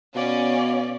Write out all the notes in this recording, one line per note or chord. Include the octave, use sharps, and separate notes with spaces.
B2 C#4 D5 F5